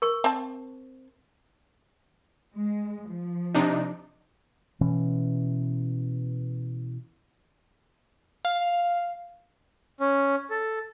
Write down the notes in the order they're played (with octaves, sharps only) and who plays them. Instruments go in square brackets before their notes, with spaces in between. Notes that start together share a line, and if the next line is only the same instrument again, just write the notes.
[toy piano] A#4 C#6
[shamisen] C4 A5
[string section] G#3
F3
[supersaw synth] C3 D4 D#4
[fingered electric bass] B2 E3 C#4
[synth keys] F5
[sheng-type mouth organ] C#4
A4